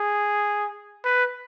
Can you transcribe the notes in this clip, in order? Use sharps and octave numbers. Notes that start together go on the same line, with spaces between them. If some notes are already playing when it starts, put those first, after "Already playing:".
Already playing: G#4
B4